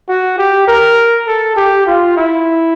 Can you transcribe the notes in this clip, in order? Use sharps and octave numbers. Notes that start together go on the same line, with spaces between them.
F#4
G4
A#4
A4
G4
F4
E4